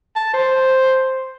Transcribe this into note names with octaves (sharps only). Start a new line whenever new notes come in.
A5
C5